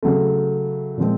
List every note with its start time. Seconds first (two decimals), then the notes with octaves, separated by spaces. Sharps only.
0.03 C#3 F#3 A3
0.98 A#2 F3 G#3 C4